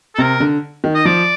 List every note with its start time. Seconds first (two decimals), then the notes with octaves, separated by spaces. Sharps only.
0.15 A4
0.18 C3 A#4
0.40 D3
0.84 D#3
0.95 D#5
1.05 F3 D5